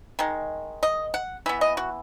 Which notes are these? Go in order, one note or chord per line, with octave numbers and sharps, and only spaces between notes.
D#3 G#3
D#5
F#5
E3 B3 E5
D#5
F#4